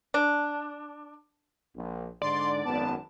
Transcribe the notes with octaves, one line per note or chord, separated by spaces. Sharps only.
D4
A#1
G#2 D3 D5 C6
G#1 F#2 B3 A5